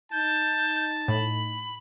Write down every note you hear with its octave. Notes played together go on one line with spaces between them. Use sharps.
D#4 A5 G6
A2 B5